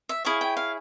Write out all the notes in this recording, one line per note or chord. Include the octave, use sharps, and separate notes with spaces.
E5
E4 G#4 C#5 F5
G5
F5